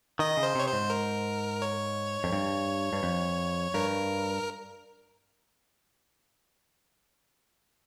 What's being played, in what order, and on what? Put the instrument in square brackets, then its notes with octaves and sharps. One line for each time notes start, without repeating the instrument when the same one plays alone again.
[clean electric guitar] D#3 [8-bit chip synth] D#5
[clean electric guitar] C#3
[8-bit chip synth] C5
[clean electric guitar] C3 [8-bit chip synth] C#5
[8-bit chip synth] C5
[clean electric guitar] G#2
[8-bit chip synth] A#4
C#5
[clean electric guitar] F2
G2
G2
F2
[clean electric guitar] G2 [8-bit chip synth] A#4